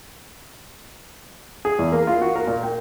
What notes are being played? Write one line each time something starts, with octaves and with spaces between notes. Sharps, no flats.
G#4
E2
A#3
F4
F#4
A#4
A#2
G5